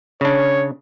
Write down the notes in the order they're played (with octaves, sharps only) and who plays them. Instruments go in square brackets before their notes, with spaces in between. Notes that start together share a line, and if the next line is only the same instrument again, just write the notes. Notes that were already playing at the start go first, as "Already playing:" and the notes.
[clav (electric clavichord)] C#3 D4 [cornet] C#5